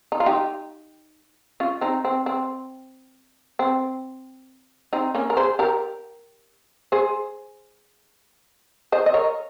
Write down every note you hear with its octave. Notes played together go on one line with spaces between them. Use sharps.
D#4
F4
D#4 G4
C#4 F4
C4 D#4
C4
C4
C4
C4 D#4
A#3 C#4
A#4
G#4 C5
G4 A#4
G#4 C5
C5 D#5
D#5
A#4 C#5